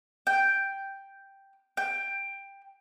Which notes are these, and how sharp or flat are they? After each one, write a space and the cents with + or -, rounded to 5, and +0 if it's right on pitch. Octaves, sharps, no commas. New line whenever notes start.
G5 +0
G5 +10